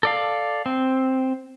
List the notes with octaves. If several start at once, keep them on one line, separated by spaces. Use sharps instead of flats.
A4 D5 F5
C4